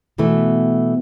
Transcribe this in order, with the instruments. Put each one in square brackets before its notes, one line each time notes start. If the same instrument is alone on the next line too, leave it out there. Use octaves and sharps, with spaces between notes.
[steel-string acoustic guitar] B2 E3 A3